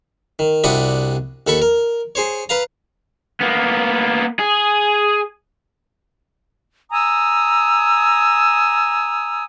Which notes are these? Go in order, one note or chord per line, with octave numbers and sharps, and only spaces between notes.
D#3
C2 C3 D4 F#4 D#5 B5
D#2 A4 B5 C#6
A#4
G#4 C5 C#5
B4 F5 A#5
A#3 B3
G#4
G#5 A#5 D#6 E6